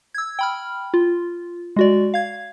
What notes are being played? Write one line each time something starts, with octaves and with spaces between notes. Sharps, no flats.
E6 G#6
G5 B5 F6
F4
G#3 F#4 D5
F5 G#6